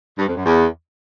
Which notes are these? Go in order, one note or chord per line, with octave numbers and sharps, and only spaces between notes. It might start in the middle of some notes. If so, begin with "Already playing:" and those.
G2
F2
F#2
E2